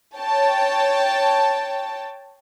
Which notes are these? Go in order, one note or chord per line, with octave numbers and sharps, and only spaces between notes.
C#5 G5 A5